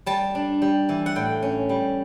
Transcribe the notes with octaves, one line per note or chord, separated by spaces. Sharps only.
G3 A5
D4
G3
E3
F#5
A2 G5
C#4
G3